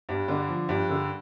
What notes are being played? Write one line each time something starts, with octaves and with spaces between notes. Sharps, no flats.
G2
D3
F3
G2
D3